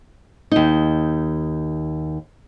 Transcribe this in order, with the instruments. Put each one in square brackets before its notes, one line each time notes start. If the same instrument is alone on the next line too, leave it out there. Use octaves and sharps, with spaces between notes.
[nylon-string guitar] D#2 D#4